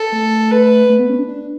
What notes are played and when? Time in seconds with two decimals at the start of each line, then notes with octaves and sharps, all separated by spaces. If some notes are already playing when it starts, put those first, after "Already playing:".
Already playing: A4
0.12 A3
0.51 B4
0.89 A3
0.99 B3
1.09 C#4
1.18 D4
1.29 D4